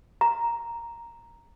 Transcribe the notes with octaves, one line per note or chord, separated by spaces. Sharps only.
A#5